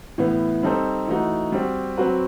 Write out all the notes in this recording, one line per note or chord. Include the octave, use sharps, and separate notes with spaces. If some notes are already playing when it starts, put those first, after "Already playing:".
A2 E3 B3
G3 C4 D#4 A4 C5
E3 A3 D#4 F#4
G3 C4 F#4
F#3 C4 F#4 B4